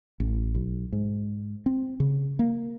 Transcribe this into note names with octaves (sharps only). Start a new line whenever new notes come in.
A1
B1
G#2
C4
C#3
A#3